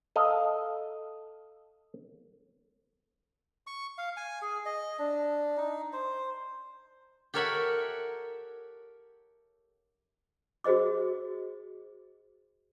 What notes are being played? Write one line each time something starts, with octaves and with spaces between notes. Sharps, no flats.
A4 D#5 F5
C#6
F5
G#5
G#4
D#5
D4
D#4
C5
G4 A4 A#4 C#5 E5 F#5
F#4 G#4 C5 D#5 D6